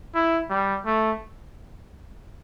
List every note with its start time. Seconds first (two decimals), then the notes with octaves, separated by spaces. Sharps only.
0.14 E4
0.50 G3
0.86 A3